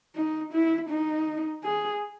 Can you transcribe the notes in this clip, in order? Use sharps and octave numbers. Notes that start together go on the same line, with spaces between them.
D#4
E4
D#4
G#4